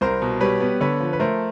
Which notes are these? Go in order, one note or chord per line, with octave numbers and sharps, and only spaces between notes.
C2 A#4 C5
B2
G3 B4 C#5
B3
D3 B4 C#5
F3
B4
A3 A#4 C5